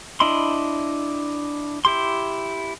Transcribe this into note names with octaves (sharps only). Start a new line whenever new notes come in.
D4 E4 D#5 B5 C6
E4 G4 C6